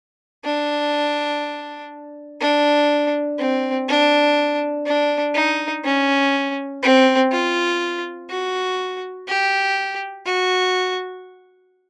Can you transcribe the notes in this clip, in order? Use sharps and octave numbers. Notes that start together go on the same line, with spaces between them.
D4
D4
C4
D4
D4
D#4
C#4
C4
F4
F#4
G4
F#4